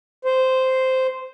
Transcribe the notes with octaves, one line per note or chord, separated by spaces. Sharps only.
C5